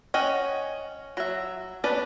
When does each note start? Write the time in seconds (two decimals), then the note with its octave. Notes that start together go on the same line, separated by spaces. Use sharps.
0.14 C#4 D#5 F#5 G5
1.17 F#3 E5
1.84 B3 C#4 D4 B4 D5